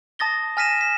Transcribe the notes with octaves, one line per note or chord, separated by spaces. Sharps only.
A5 D#6 A6 A#6 G7
G#5 F6 A#6 B6 D#7 E7
B6 E7